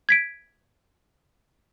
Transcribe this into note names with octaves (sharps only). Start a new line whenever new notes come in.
G#6 B6 D7